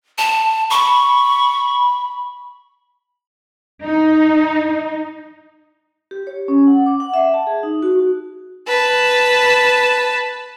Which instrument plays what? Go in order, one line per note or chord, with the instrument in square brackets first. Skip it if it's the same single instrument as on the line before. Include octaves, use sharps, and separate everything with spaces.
[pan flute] A5
[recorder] B5 [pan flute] C#6
[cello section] D#4
[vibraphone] G4
C#5
C#4
F#5
D6
F#5
E5
A5
G#4
D#4
F#4
[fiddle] B4 A5